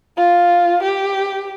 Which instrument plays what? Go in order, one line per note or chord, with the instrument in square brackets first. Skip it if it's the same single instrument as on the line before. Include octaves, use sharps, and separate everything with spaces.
[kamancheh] F4
G4